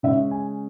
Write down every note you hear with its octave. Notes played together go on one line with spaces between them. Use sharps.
C#3 G#3 C#4 E5
G#5